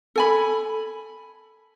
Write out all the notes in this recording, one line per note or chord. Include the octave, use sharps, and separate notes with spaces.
A4 G#5 B5